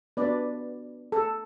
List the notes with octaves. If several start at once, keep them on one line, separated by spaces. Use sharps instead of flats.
B3 D4 F#4 B4 D5
A4